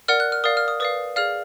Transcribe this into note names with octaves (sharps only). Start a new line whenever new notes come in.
A#4 D5 F#5 F6
F#6
F6
A#4 D5 F5 D#6
F6
D#6
B4 D5 F5 D#6
G#4 D5 F5 F6